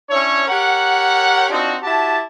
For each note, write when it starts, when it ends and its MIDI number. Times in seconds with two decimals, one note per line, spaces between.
0.10 0.44 61
0.10 0.44 62
0.10 0.44 64
0.10 0.44 73
0.47 1.46 67
0.47 1.46 70
0.47 1.46 73
0.47 1.46 78
1.50 1.75 60
1.50 1.75 62
1.50 1.75 63
1.50 1.75 65
1.50 1.75 66
1.83 2.19 64
1.83 2.19 66
1.83 2.19 67
1.83 2.19 81